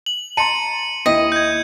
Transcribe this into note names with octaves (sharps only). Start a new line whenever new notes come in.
F#7
A5 A#5 C6 C#7 D#7
D#2 E4 D#5 G5
G6 G#6